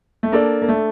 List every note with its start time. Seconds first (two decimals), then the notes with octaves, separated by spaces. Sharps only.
0.23 A3
0.32 A#3 D4 A4 D5
0.62 A#3
0.69 A3